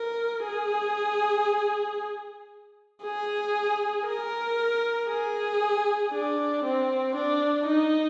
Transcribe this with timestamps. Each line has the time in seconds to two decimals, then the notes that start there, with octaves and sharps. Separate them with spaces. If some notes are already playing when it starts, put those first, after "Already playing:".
Already playing: A#4
0.45 G#4
3.04 G#4
4.07 A#4
5.09 G#4
6.13 D4
6.64 C4
7.16 D4
7.67 D#4